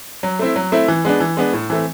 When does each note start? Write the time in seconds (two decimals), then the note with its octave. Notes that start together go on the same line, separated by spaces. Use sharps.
0.23 F#3
0.39 A3 C4 E4
0.56 F#3
0.72 A3 C4 E4
0.88 E3
1.05 G#3 B3 D4
1.20 E3
1.37 G#3 B3 D4
1.53 A2
1.70 E3 A3 C4